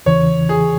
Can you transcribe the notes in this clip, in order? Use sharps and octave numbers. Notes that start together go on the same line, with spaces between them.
E2 C#3 E3 C#5
G#4